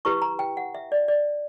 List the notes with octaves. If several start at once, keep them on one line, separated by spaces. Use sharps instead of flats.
E4 G4 B4 C#6
A#5
G5
F#5
E5
D5
D5